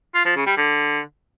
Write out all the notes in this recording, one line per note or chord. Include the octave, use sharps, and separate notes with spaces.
F4
F3
C#3
G3
D3